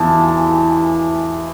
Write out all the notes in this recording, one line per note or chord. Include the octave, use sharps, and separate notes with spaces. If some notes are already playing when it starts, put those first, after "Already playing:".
Already playing: E2 E3 A5